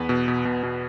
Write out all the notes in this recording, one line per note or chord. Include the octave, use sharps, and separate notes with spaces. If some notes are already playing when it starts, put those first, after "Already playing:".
Already playing: E2 B3 B4
B2
B2
B2
B2